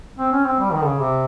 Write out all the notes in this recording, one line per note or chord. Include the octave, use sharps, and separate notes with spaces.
C4
C#4
C4
G3
D#3
C#3
C3